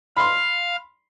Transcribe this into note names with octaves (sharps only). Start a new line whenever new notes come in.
F5 B5 C6